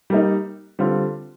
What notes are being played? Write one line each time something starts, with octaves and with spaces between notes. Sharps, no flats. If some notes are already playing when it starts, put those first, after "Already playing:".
G3 A#3 D#4
D3 G3 C4 F4